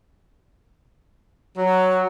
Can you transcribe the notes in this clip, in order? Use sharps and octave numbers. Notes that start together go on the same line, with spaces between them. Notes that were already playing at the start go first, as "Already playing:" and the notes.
F#3